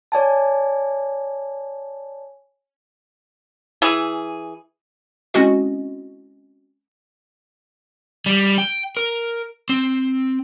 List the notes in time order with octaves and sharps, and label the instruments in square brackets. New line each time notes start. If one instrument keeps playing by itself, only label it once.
[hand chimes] C#5 D5 G#5 A5
[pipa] E3 G#4
[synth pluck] G#3 C4 C#4 E4 F#4 D#5
[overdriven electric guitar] G3
G5
A#4
C4